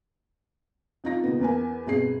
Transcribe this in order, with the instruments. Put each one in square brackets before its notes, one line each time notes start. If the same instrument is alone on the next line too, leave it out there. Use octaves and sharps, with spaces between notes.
[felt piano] F2 D#4 F4 A#6
A#2 C#3 B3
E2 A#4 B4 G#5
G1 B2 C4 G#4 C7